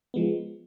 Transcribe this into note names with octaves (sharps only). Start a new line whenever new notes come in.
F3 G#3 B3